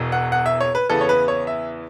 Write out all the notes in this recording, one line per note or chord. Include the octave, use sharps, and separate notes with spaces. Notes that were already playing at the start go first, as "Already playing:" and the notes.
Already playing: E1 E2 B2
F#5
F#5
E5
C#5
B4
E2 C#3 E3 B3 A4
C#5
B4
C#5
E5